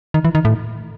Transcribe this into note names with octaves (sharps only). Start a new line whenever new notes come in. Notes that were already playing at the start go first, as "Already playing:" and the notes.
D#3
E3
D#3
A2